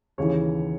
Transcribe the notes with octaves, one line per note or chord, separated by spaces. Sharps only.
D#2 C#3 E3 C#5